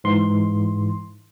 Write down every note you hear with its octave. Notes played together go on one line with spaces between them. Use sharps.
G#2 E3 C6